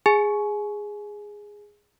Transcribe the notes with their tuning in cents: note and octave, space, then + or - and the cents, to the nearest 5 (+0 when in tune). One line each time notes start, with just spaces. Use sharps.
G#4 -10 G#5 +30